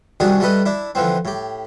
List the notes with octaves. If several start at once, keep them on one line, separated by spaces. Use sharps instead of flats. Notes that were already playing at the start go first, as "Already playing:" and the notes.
C2 D#3 G3 D4 F#4 G#4
G3 A3 G4 A4 B4 D#5
D4 E4
D3 E3 F3 C4
A2 G4